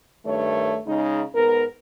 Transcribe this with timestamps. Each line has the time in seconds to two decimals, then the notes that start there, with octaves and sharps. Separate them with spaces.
0.25 G2 D#3 A3 C#5
0.86 C#3 G#3 D#4
1.35 G#2 B3 A#4